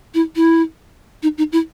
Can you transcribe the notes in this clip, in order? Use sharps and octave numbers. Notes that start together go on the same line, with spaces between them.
E4
E4
D#4
D#4
E4